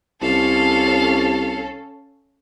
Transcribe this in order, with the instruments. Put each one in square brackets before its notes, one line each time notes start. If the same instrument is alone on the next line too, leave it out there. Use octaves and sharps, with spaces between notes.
[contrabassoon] C2 [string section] C#4 A4 [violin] F5